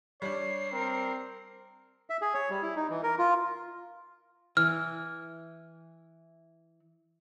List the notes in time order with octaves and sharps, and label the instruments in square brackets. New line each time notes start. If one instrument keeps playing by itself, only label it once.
[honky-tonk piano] G3 D4 [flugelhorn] C#5 [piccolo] C7
[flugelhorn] C4 [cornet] A#4
[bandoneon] E5
G#4
C#5
G3
E4
D#4
E3
A#4
F4
[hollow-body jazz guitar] E3 [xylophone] F6